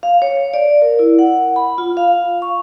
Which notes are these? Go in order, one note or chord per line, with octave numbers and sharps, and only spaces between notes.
F5
C#5
D5
A#4
E4
F#5
B5
F4
F5
C#6